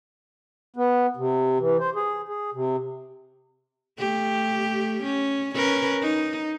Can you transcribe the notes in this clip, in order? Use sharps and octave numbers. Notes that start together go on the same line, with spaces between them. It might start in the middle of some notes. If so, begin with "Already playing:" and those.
B3
C3
E3
C5
G#4
G#4
C3
A3 G4
C#4
C#4 A#4 B4
D#4